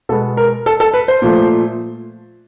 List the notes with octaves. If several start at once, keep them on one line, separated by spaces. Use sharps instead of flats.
B2 G#3 B3 A4
A#4
A4
A4
B4
C5
A#2 F3 A3